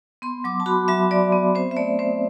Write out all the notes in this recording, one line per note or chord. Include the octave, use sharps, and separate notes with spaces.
B3 C6
F#3 D6
A5
F#4 B5
F#3 E5
F#3 D5
B3
C4 C5
E5
A3 D5
C4 C5